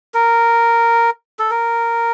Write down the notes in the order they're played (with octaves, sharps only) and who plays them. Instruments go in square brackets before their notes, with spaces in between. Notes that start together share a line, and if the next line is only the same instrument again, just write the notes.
[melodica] A#4
A4
A#4